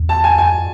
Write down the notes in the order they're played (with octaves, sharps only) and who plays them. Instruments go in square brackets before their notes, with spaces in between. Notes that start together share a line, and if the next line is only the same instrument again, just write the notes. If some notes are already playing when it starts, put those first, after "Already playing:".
Already playing: [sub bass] E2
[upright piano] A5
G#5
[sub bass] F2 [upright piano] G#5